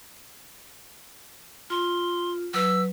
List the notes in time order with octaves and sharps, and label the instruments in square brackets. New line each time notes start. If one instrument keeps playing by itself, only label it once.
[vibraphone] F4 [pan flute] C6
[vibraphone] F#3 B4 [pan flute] E6